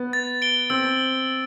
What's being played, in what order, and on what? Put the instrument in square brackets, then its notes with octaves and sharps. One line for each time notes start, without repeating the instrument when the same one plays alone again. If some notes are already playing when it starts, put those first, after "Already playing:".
Already playing: [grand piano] B3
[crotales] A6
D7 G7
[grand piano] C4 [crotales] E6